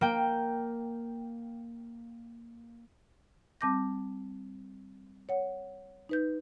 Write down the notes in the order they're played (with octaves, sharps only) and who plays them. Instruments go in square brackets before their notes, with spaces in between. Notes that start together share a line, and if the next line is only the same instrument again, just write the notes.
[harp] A#3 G5
[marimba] G3 C4 A5 D6 G6 A#6
C#5 F#5
D#4 B4 G6